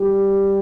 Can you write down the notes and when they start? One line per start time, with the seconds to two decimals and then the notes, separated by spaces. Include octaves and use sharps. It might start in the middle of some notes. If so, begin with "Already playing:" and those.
Already playing: G3 G4